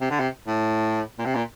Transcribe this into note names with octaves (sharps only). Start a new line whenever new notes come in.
C3
D3
C3
A2
A#2
C3
A#2